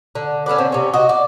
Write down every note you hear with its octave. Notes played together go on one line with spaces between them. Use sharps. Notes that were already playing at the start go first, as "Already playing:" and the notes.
D3
C#4 A4 B4 D5
D3 C4 C#4
C3 C#4
F#4 D#5
D5